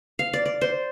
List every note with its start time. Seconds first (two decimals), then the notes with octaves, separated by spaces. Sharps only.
0.19 F5
0.33 D5
0.46 D5
0.61 C5